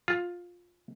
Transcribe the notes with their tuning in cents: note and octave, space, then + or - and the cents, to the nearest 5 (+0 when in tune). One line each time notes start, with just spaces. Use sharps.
F4 +10